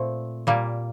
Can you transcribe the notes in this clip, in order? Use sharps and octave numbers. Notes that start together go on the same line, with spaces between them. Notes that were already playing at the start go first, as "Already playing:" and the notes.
Already playing: A#2 A3 C4
A#2 G3 A#3